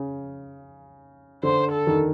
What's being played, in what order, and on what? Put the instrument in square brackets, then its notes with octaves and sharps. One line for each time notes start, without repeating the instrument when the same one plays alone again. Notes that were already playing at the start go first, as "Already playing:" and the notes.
Already playing: [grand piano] C#3
[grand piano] D3 [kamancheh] C5
[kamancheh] A4
[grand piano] D#3